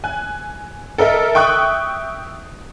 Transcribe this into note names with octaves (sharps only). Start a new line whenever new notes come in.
G#5 F#6
A4 A#4 D#5 E5
E5 G5 C#6 D#6 F#6